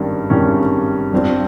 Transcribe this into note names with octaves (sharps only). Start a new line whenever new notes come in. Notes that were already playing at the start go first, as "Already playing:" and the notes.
Already playing: G#1 G2 D#3 G3 C#4
G#1 G2 D#3 G3 C#4
G2 G3 C4 F4